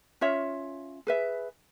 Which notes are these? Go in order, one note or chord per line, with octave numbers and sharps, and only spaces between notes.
C#4 F4 C#5 E5
G#4 B4 E5